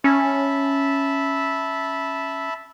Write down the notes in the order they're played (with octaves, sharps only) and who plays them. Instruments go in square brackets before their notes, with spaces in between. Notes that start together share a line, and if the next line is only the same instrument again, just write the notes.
[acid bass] C#4 [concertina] E5 A5 B5